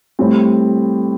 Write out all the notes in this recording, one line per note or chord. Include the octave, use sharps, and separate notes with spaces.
A2 G3 C4